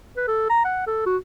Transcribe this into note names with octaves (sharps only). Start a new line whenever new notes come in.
B4
A4
A#5
F#5
A4
F#4